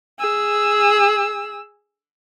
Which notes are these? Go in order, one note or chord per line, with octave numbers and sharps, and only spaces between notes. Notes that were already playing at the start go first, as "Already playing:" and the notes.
G#4 E6